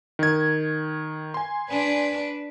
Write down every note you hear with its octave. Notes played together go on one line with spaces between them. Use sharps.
D#3 G#6
G#5 C6
D4 B4 D5